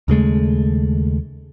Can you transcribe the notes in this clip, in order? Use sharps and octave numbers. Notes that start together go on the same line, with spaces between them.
D#2 C#3 G#3 A3